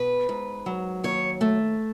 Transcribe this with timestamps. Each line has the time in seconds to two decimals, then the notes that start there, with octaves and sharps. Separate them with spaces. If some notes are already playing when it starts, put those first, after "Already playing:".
Already playing: B2 B4
0.29 G#2
0.66 F#3
1.04 D#2 C#5
1.41 A3